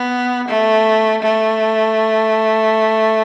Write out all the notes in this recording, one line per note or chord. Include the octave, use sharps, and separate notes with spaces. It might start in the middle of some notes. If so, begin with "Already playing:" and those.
Already playing: B3
A3
A3